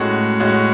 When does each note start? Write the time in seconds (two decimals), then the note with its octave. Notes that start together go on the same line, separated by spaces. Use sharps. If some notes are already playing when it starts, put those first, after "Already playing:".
Already playing: A2 G#3 C#4 F#4
0.40 A2 G#3 C#4 F#4